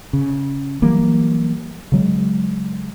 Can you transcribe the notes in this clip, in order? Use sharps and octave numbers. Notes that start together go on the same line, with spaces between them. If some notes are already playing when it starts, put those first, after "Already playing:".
C#3
E3 F#3 G3 A#3
C#3 F#3 G#3